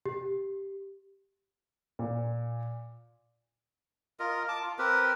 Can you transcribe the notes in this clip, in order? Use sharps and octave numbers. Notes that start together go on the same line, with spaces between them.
G4
A#2
F4 A#4 D#5
A5 D6
F4
C4 G4 A#4 B4